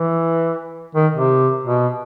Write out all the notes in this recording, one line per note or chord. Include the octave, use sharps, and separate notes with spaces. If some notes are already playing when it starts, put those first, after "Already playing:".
Already playing: E3
D#3
C3
B2